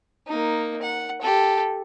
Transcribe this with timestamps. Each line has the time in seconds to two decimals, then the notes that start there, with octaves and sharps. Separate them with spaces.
0.27 A#3 D#4
0.82 F#5
1.22 G4 A4